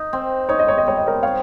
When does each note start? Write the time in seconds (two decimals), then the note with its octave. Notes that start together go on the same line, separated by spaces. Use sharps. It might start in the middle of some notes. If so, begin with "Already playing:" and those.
Already playing: D#4
0.13 C4
0.49 D#4 C#5
0.59 D#5
0.68 C#5
0.78 D#5
0.86 G3 C#5
0.97 D#5
1.07 A#4 C#5
1.23 C4 C#5 F5